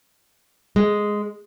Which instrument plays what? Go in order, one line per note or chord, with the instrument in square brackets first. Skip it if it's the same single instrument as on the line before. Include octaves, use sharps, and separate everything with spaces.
[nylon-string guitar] G#3